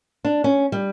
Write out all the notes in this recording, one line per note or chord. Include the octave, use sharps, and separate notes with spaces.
D4
C#4
G3